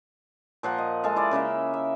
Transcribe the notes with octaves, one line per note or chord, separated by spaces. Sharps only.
A#2 F3 F#5 A#5
D#5
G#3 A4 D#5 F5
E4 G#4 D5
C#3 A#3 A#4 E5
E5